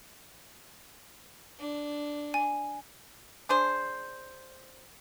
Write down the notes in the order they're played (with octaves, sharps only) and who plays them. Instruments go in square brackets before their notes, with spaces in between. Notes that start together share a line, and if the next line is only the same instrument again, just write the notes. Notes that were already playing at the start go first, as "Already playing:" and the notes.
[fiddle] D4
[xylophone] G#5
[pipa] D4 G#4 C5